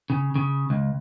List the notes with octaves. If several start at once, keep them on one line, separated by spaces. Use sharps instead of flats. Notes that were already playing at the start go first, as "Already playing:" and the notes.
C#3
C#3
C#2